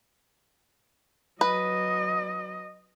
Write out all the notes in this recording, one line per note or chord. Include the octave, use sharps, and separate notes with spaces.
F#3 B4 D#5